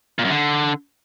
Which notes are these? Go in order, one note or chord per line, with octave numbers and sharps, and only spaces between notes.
A#2
F#2
D3